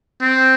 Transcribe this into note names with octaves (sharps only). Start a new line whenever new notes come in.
C4